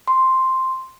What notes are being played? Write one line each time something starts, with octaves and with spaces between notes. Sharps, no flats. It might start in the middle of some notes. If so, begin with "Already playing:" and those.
C6